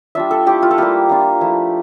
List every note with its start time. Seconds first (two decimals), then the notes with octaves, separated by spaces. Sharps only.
0.15 G3 D4 F4 E5
0.31 A4
0.46 A3 E4 G4
0.62 F4
0.71 A4
0.78 G3 A#3 E4 G4
1.09 A#3 D4 F4
1.41 F3 A3 E4